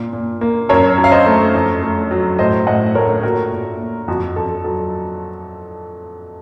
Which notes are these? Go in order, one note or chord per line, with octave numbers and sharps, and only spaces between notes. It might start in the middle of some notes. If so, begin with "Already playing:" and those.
Already playing: A#2
A#2
A#3
F#2 A#4 C#5
F#2
F5
C5 D#5
A3
F2
A3
F#3
A2 C5 D#5
A2 D#5 F#5
A3 A#4 C#5
A#2 F#4 A#4
A#2
A#3
F2 F#4
F2 A4
F#3 A4